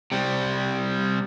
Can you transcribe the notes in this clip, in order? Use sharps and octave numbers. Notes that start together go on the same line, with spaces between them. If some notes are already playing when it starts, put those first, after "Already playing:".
C3 G3